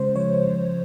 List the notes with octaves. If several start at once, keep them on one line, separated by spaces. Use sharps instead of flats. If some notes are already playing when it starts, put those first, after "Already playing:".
Already playing: C#3 G#3 C5
F3 C#5
C#3